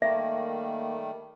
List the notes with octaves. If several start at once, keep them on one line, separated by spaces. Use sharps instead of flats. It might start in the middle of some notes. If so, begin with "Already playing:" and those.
D#3 G3 A3 A#3 E5